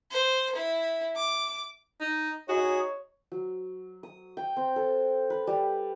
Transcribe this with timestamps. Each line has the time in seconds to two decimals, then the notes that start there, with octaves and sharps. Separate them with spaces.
0.11 C5
0.55 E4
1.16 D6
2.01 D#4
2.49 D#4 F#4 G#4 C#5
3.32 F#3
4.03 D#6
4.37 G5
4.57 C4
4.76 A4
5.30 B4
5.47 G3